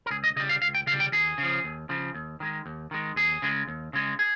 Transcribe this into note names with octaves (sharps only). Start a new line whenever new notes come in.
A#4
C#2 G#4
D#5
C#3 G3 D#5
F5
C#2 F5
G5
C#3 G3 F5
G5
D#2 G#4
C#3 F3
D#2
C#3 F3
D#2
D#3 G#3
D#2
D#3 G#3
D#2 G#4
C#3 G#3
D#2
C#3 G#3
G#4